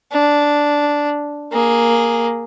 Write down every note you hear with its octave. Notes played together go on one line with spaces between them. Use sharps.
D4
A#3 G#4